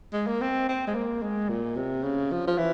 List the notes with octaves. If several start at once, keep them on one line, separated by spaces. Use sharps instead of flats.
G#3
A#3
C4
C4
G#3
A#3
G#3
A#2
C3
C#3
F3
F3
E3